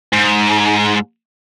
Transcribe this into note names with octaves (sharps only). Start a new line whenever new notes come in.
G#2